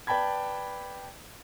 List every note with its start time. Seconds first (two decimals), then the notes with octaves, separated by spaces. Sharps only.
0.07 B4 D5 G5 A5 B5 G#6